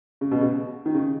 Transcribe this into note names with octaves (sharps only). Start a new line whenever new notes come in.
C#3
B2
C#3
D#3
C#3